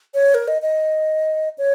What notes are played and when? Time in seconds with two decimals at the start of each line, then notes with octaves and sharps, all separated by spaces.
0.14 C#5
0.34 A#4
0.48 D#5
0.62 D#5
1.58 C#5